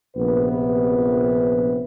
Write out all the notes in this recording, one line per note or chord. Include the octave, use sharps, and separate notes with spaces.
A#1 C3 B3 B4